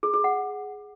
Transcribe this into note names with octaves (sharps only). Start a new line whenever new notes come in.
G#4
G#4
F#5